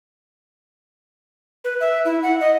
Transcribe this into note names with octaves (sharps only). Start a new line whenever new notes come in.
B4
E5
E4
F#5
D#5